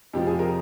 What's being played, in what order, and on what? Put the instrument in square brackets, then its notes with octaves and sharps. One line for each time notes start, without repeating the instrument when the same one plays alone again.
[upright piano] F2 C3 F3 G4
G#4
A#4